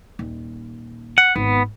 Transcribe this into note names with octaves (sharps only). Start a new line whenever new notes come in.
D#1
F#5
G#1 B3